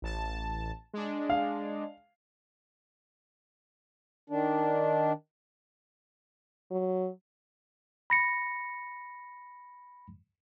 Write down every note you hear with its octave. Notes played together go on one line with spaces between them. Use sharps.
A1 A5
G#3 D4
F5
D#3 D4
F#3
B5 A#6 C#7